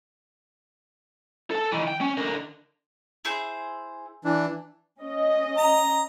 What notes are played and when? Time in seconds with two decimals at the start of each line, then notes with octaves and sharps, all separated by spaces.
1.51 A4 A5
1.72 D#3 E3
1.88 G5
2.01 C#4
2.17 D3 A#4
3.25 E4 G#4 C5
4.25 E3 D4
5.01 C#4 D#5
5.57 A#5